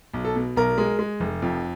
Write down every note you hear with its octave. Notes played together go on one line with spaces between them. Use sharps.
B1
A4
B2
B1 A#4
G#3
G#3
F1
F2